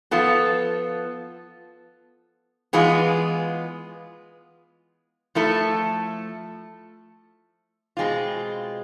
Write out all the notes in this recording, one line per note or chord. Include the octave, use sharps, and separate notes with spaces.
F3 B3 F4 A4
E3 G#3 B3 F4 G#4
F3 A3 E4 A4
B2 G#3 C4 F4